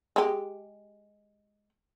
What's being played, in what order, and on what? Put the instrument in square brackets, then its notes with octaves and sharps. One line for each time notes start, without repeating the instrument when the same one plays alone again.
[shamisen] G#3 G4